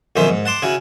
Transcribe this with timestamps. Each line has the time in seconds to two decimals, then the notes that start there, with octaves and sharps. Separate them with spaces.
0.16 B1 F2 D#3 C#4 C5 E5
0.30 G#2
0.46 F#5 A5 C6 D6
0.62 C#3 C#4 E4 F#4